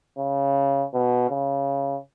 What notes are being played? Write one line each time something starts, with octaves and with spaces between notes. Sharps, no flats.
C#3
B2
C#3